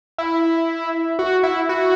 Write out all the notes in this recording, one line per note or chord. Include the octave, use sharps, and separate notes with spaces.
E4
F#4
E4
F#4